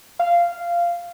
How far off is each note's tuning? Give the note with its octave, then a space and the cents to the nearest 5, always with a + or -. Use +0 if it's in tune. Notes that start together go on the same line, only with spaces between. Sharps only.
F5 -15